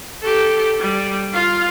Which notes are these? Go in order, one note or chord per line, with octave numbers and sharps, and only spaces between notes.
G4 A4
G3
F4 F5